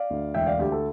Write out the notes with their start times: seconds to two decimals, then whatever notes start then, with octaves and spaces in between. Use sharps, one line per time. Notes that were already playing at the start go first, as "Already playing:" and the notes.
Already playing: D5 F5
0.10 D2
0.34 E1 E5 G5
0.46 D5 F5
0.59 D2 G4
0.72 A4